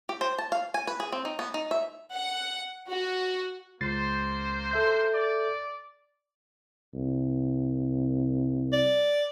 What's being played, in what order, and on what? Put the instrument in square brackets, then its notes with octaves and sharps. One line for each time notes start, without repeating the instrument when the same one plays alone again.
[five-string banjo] G4
C5
A5
F5
G#5
B4
G#4
C4
D#4
B3
D#4
E5
[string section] F#5
F#4
[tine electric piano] C#2 A6 C7 [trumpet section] A#3 C5
[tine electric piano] A4 E5 G6
[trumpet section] D5
[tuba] C2
[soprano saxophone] D5